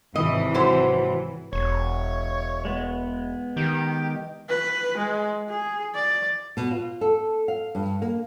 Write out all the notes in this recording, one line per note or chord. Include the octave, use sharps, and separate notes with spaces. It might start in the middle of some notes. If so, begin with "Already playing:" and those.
G#1 C3 E3 D#5
F#3 C5
E1 C#5
G#3 B3
D#3 G4
B4
G#3
G#4
D5
B2
F4
A4
F5
G2
A#3